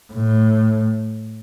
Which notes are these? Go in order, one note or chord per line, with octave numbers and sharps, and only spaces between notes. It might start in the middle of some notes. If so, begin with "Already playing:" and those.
A2